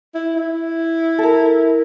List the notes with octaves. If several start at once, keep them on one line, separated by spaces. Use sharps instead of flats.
E4
E4
A4 A#4